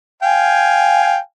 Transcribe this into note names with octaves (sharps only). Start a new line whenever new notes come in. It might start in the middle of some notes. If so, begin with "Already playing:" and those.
F5 G5 G#5